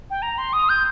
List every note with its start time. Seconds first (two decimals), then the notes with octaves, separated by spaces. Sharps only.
0.10 G5
0.22 A#5
0.38 C6
0.53 D#6
0.69 G6